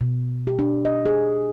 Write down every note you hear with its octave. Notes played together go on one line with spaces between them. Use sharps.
B2
G4
D4
D#5
G#4